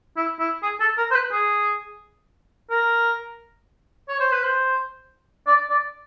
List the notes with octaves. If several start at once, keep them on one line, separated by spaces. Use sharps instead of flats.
E4
E4
G#4
A4
A#4
C5
B4
G#4
A#4
C#5
C5
B4
C5
D5
D5